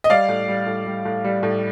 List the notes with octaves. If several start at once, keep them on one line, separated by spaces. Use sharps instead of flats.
D#5
G3 D5 F5
A2
G3
A2
G3
A2
G3
A2